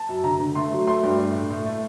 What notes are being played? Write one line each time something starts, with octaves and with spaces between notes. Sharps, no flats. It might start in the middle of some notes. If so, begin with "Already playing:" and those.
Already playing: A5
F#2
D3 A#5
D3
A3 C6
F#3
A3 C6
G2
A3
A2
A2
A3